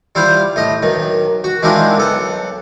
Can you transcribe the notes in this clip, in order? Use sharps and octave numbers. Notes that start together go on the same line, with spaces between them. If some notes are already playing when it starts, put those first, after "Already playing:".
G3 E4 F4 C5
A2 D#5
B1 D#3
F#4
D#3 G#3 C4 D4 E4 F4
B1 A4 F#5